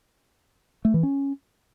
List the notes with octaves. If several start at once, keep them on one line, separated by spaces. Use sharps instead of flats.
A3
E3
C#4